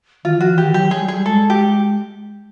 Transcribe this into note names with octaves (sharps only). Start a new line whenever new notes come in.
D#3 F4
F3 F#4
E3
D#3 G4
F#3 G4
G#4
G3
G#4
G#3 A4
G4